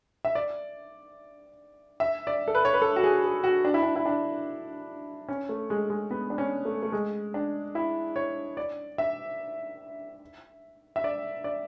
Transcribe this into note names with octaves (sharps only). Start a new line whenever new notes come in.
E5
D5
E5
D5
A4
B4
C#5
B4
A4
F#4
G#4
G#4
F#4
D4
E4
D4
E4
D4
C#4
A3
G#3
G#3
B3
D4
C#4
A3
A3
G#3
D4
E4
C#5
D5
E5
E5
D5
D5